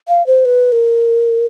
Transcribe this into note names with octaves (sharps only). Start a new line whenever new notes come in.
F5
C5
B4
A#4